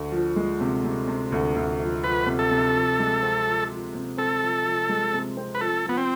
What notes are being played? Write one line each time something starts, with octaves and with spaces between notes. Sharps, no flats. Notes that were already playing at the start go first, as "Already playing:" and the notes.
Already playing: D2
F3
G#3
C3
C3
C3
D2
D2
F3
F3 B4
C3
A4
C3
F3
G#3
C4
F3
F3
C3
C4 A4
F3
F3
G#3
C3
C4
B4
F3 A4
F3 B3
C4